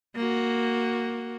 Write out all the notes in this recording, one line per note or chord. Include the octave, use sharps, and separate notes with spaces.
A#3 F#4